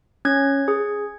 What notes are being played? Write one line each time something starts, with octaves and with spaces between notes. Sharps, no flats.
C#4 G#6
G#4